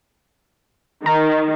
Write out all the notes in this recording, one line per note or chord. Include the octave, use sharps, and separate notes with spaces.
D#3 A#5